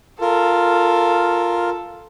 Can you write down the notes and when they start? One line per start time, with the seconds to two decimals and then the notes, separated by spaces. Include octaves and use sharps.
0.21 F4 A4 A#4